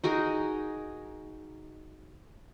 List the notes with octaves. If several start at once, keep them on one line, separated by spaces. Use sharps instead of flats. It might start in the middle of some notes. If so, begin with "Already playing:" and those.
D#4 F#4 G#4 A#4